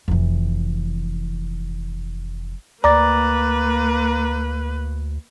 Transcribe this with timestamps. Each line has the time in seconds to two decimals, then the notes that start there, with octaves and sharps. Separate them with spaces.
0.08 F1 E3
2.84 D2 A#3 B4 D5 A#5 D6 A6